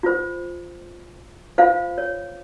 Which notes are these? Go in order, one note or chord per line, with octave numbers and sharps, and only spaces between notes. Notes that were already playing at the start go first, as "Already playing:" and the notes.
F4 C5
F4 C5 F5
C#5